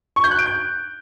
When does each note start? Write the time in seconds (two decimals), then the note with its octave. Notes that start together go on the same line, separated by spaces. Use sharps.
0.16 C#6
0.24 G6
0.31 F#6
0.39 D7
0.46 G6